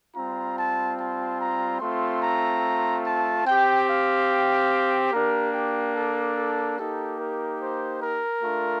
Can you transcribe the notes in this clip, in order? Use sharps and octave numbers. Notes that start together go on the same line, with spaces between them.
G3 C4 F4 A#5
A5
A5
A#5
A3 C4 F4 C6
A#5
A5
C4 G4 G5
F5
A#3 D4 G4 A#4
G4
A4
A4
A#3 D#4 G4 A4
A#4
C5
A#4
A3 D4 F4